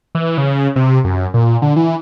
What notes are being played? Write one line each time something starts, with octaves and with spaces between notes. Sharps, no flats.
E3
C#3
C3
F#2
A#2
D3
E3